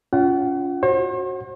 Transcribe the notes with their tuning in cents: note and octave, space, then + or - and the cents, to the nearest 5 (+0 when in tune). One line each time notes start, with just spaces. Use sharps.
C#4 +30 F4 +0 F#5 +35
F#4 +0 C5 +45